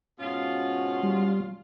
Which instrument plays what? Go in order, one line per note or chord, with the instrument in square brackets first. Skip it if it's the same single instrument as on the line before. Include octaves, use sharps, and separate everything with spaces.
[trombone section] G#2 C#4 F#4 [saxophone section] B2 F4
[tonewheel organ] G3